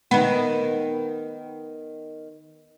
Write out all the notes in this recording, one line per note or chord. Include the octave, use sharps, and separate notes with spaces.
D#3 B3